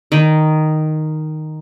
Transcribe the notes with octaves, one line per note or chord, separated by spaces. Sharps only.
D#3